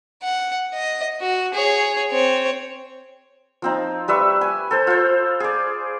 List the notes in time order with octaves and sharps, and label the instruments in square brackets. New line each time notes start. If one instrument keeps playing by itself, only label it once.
[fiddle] F#5
D#5
F#4
G#4 C#5
C4 C#5
[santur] F3 C4 D#4
G3 B4 E5 C#6
G#5
A4 C5
F4 C5
G#4 D5